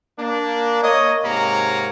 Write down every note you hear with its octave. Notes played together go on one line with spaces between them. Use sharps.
A#3 D4
A#3 C#5 D#5
G#2 C3 A#3 C#5 A#5